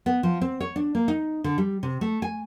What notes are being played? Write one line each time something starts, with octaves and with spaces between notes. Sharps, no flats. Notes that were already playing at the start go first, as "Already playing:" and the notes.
B3
F3
C4
C#5
D4
A#3
D#4
D3
G3
C3
A3
G#5